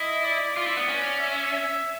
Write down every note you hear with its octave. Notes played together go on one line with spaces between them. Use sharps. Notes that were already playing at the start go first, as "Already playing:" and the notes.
Already playing: E4 D#5
D5
F4 D5
E4
B3
C#4
E5
E5